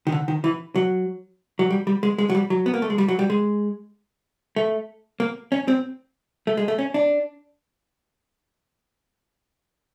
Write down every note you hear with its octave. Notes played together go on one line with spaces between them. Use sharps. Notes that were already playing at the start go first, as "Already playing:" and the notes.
D#3
D3
D#3
E3
F#3
F#3
G3
G3
G#3
G#3
F#3
G3
F#3
B3
A#3
A3
G#3
G3
F#3
G3
G#3
A3
A#3
C#4
C4
A3
G#3
A3
C#4
D4